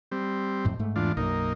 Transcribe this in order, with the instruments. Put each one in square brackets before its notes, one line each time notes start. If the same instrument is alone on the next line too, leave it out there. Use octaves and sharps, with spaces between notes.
[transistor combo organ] G3 C4
[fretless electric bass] F2 A2
G#2 A3
[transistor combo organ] E2 D4 F4
[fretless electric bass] B1 F#2 [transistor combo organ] A#3 D#4